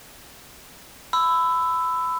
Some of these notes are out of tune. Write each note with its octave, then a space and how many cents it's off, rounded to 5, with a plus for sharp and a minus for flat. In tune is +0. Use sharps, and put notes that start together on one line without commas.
B5 +25 E6 +0